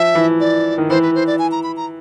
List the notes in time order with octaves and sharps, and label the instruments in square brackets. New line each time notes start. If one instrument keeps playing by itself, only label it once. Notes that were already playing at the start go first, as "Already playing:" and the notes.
Already playing: [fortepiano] F3 [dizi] E5
[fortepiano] E3
[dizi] D5
[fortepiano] D#3
[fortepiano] E3 [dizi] C5
[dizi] B4
C5
D5
G#5
A#5
B5
A#5